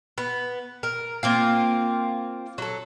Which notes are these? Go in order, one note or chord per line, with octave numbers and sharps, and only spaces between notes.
B3
A#4
A#3 C4 F4
F#3 A4